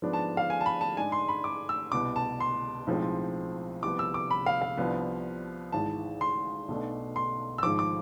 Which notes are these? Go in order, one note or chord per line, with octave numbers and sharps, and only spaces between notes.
G#2 F3 B3 D4
A5
F5
G#5
A5
B5
A5
G#2 G#3 D4 G#5
C6
B5
D6
E6
C2 B2 B3 D6
A5
C6
B1 A2 F3 G#3 C4
C2 C3 F3 B3 D6
E6
D6
B5
F5
F5
C2 C3 F3 B3 D4
G#1 G#2 E3 A5
C6
B1 B2 A3 D4
C6
E6
G#1 G#2 F3 D6
D6